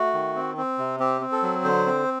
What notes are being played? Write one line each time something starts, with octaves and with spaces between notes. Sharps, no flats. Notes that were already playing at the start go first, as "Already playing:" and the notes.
Already playing: A3 F#4
D#3
C4
C4
C3
C4 G4
C4
A4
F#3
D3 C5
C4